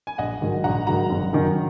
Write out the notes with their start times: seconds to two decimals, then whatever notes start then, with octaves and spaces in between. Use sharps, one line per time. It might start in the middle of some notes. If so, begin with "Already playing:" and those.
0.07 G#5
0.18 A#1 D#5 F#5
0.41 G#2 D#3 F#3
0.64 A#1 F#5 A#5
0.87 G#2 D#3 F#3 F#5 A#5
1.10 F#1
1.33 F#2 D#3 F#3